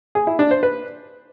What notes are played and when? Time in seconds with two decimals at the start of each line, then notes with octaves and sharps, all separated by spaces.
0.15 G#4
0.27 E4
0.39 D4
0.51 C5
0.63 B4